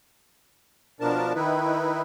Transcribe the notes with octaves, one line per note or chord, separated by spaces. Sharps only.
B2 F3 D4 A#4 A5
D#3 D#4 E4 B4